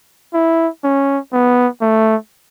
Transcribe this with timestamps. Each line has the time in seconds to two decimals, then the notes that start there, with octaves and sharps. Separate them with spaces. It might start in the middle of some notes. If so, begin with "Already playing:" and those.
0.34 E4
0.84 C#4
1.33 B3
1.81 A3